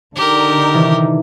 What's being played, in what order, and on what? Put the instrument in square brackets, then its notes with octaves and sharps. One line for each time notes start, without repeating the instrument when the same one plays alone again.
[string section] D3 D#4 [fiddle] G4 A#4
[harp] C3 D#3 E3